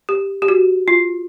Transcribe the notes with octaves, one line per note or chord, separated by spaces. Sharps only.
G4
G4
F#4
F4